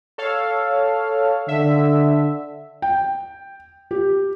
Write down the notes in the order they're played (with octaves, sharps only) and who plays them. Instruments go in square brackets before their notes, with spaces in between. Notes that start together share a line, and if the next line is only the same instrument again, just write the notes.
[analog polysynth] A4 C#5 F5
[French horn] D3 [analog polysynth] E5
[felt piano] G5
G4